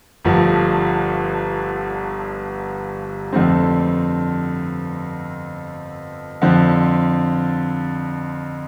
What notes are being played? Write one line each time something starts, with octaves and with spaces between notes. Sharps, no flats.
G1 G2 F3 A3
F2 D3 F3 A3 C4
F2 D3 F3 C4